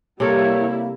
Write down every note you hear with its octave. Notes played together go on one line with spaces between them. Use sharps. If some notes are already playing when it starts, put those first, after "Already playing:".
C3 G3 A#3 E4 A4 A#4 C#5